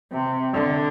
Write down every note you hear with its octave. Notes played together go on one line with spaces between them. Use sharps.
C3
D3